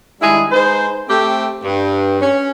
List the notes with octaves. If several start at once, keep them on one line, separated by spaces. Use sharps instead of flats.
D#3 G3 G#3 D4 E4 G#4
G#3 D#4 B4 C5
A3 C4 G4
G2
C#4